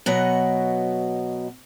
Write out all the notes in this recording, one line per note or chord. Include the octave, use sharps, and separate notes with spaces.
B2 F#3 B3 D#5 F#5